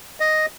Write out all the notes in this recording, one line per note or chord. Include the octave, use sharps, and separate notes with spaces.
D#5